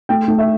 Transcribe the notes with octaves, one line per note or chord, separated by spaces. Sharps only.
A3 G5
A3
E5